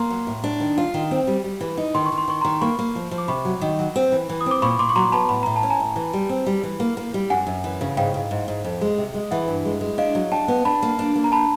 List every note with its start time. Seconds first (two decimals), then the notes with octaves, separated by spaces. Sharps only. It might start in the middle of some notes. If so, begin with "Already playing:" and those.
Already playing: A#3 A#5 C6
0.10 F#3
0.27 A2
0.44 D4
0.60 D#3
0.78 F4
0.94 D#3
1.11 C4
1.27 G3
1.44 G3
1.61 E3
1.77 D#4
1.95 D#3 C6
2.06 C#6
2.12 D#3
2.18 C6
2.28 D#3 C#6
2.41 A#5 C6
2.45 D#3
2.61 A#3 B5 C#6
2.79 A#3
2.95 F3
3.11 F3
3.18 D6
3.28 C3 B5 C#6
3.45 F#3
3.61 D#3
3.79 F#3
3.96 C4
4.12 E3
4.29 E3
4.41 D#6
4.46 C4
4.51 D6
4.62 A#2 B5 C#6
4.79 A#2 C6 D6
4.89 C#6
4.96 F#3 A#5 C6
5.12 B3 A5 B5
5.29 A2 B5
5.43 A2 A#5
5.56 A5
5.63 C#4
5.70 G#5 A#5
5.80 A2
5.96 E3
6.13 G3
6.29 C4
6.46 G3
6.63 E3
6.80 A#3
6.97 A#3
7.14 G3
7.30 F#2 F#5 G#5
7.47 F#2
7.64 E3
7.81 C#3
7.97 G#2 F5 G5
8.14 G#2
8.31 G#2
8.48 G#2
8.64 F2
8.81 G#3
8.98 C3
9.14 G#3
9.31 E3 E5 F#5
9.48 G2
9.65 G#3
9.81 G#3
9.98 D4 D#5 F5
10.15 F#3
10.31 D4 G5 A5
10.48 B3
10.65 D4 A5 B5
10.82 A#3
10.99 D4
11.15 A#3
11.24 A#5
11.32 A5 B5